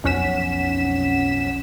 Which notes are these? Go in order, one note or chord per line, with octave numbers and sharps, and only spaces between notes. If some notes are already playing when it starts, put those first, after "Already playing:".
B1 F2 C#4 F#5 B6 E7